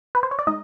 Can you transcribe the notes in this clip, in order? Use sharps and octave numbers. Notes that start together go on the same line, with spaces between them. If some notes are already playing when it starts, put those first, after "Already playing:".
B4
C5
C#5
D5
G#3 D#4 D#5